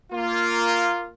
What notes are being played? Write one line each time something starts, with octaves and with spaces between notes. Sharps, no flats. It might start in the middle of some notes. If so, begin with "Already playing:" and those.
A#3 F4